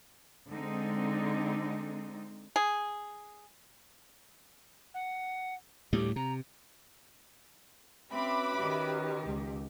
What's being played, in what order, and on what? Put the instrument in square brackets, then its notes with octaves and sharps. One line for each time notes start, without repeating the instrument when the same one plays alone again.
[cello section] D3 G#3 C4 D#4
[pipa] G#4
[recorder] F#5
[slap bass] D2 A2 G3 [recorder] G4
[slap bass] C3 [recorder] A#5
[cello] C4 [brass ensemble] C#4 F#4 B4 [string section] E5 B5 D6
[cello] D#3 G4
[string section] C#2